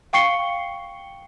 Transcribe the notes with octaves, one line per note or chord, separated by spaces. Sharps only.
F5 G5 C#6 C7 C#7 G7